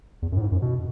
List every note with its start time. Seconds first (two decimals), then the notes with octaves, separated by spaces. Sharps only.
0.22 E2
0.32 F#2
0.37 A2
0.41 G#2
0.52 F#2
0.62 B2